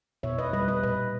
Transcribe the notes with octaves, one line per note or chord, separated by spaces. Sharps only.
B2 C#5 E5
B4 D#5
G3 B4 D#5
B4 D#5
A#2 B4 D#5